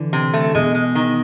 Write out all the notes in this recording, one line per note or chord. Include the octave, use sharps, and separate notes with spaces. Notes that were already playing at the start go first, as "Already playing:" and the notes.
Already playing: D3 E3
C3
A3
B2 G#3
G#3
D#3